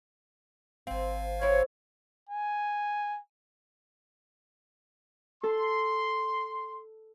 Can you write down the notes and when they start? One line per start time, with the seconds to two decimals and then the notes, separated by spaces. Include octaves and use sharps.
0.87 G#1 C4 F5
1.41 C4 E4 C#5
2.29 G#5
5.43 A4 C6